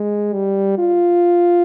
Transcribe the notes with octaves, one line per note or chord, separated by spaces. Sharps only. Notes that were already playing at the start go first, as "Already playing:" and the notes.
Already playing: G#3
G3
F4